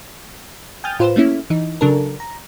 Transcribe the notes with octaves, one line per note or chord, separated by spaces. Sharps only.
G5 G#5 D#6 F6 G6 A6
A2 F4 B4 C5 E7
A3 A#3 C#4 E4
E3 D#4
C#3 F#3 D4 A4 A#4
A#5